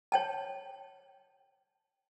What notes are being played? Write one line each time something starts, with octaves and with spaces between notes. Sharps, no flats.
C#5 G5 A5